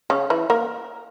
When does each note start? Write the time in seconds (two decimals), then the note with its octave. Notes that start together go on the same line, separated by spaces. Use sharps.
0.10 C#3 C#4
0.30 E3 E4
0.50 A#3 A#4